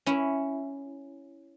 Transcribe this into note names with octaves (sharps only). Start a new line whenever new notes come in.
C#4 E4